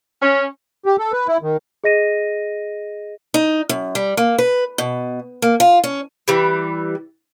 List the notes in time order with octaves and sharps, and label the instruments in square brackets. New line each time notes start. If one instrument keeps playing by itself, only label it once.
[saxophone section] C#4
[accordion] G4
A4
B4
E4
D#3
[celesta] G#4 D#5 A#6 D#7
[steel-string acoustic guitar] D#4
F#2
G3
A#3
B4
B2
A#3
F4
C#4
[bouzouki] E3 G3